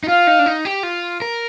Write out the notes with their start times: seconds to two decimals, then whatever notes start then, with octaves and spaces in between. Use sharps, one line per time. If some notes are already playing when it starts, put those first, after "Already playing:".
0.04 D#4
0.08 F4 F5
0.27 D#4
0.39 D4
0.46 D#4
0.65 G4
0.83 F4
1.22 A#4